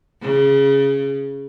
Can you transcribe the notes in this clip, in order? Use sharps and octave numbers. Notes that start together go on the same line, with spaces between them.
C#3